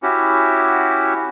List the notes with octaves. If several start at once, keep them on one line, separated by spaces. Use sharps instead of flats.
C#4 E4 F#4 G4